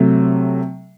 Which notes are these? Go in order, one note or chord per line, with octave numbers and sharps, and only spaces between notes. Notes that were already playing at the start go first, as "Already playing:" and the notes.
Already playing: C3 F#3 A3